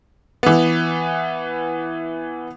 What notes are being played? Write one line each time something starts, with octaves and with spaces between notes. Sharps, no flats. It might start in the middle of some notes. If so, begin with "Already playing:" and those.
E3 B3